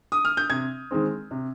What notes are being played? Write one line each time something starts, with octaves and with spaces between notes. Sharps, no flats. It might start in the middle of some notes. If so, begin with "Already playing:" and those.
D#6
F6
G6
C3 G#6
D#3 G#3 C4
C3